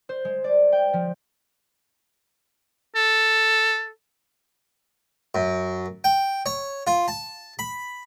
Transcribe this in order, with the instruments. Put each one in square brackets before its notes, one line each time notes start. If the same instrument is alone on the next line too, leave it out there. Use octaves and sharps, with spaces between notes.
[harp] C5
G#3
D5
G5
F3
[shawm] A4
[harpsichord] F#2
G5
C#5
F4
A5
B5